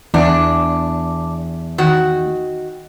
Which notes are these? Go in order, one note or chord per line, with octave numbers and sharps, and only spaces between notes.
E2 D4
D#3 F#4